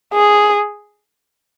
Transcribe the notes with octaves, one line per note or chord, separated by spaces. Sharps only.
G#4